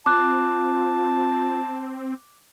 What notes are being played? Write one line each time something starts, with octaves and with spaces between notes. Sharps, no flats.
C4 F4 A5 D6 F#6